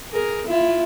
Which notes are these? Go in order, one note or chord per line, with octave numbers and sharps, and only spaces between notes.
G#4 A#4
E4 F4